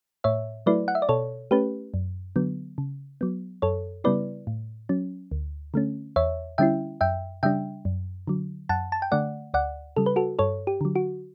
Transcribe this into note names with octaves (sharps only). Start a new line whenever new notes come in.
A2 C#5 E5
F#3 A3 E4 B4 D5
F#5
E5
D5
B2 A4 C#5
A3 C#4 G4 B4
F#2
D3 F#3 B3
C#3
F#3 B3
F#2 A4 C#5
C#3 G3 B3 E4 B4 D5
A2
F#3 C#4
D2
D3 A3 C#4
E2 C#5 E5
D3 G3 C#4 E4 E5 G5
F#2 E5 G5
C#3 G3 D4 E5 G5
F#2
D3 F#3
F#2 F#5 A5
A5
G5
D3 A3 D5 F#5
D2 D5 F#5
C#3 G3 A4
B4
F#4 A4
G2 A4 C#5
G4
D3 F#3
F#4